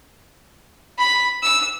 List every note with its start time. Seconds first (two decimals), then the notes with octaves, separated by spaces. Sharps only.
0.98 B5
1.42 E6